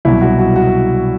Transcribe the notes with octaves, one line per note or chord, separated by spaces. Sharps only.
C2 B2 F#3 E4
F#4
F#4
F#4